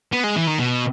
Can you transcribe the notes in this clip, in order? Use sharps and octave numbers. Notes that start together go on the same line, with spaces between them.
B3
G#3
E3
D#3
B2